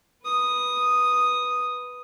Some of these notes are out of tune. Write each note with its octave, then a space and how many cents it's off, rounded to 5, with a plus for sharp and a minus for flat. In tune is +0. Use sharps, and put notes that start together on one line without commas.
B4 +0 D#6 +0